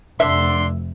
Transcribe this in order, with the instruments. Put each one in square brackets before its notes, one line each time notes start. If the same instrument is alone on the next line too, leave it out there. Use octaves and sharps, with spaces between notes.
[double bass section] F1 [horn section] D3 D4 C6 [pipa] E5